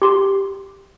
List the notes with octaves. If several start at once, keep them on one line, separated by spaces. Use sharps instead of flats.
G4 C6